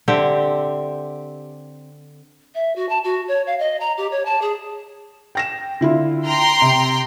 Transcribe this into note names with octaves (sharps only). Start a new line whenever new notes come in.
D3 C4 G4 E5
E5
F#4
A5
F#4
C#5
F5
D#5
A#5
G4
C#5
A5
G#4
G5 A#6 E7
D3 E4 F4
G5 A#5 C6
C3